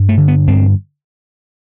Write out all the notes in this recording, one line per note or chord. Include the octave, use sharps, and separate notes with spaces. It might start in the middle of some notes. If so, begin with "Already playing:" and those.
Already playing: G2
A3
D3
B3
G2 C4